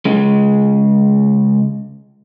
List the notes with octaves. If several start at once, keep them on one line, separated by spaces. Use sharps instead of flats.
C#3 G#3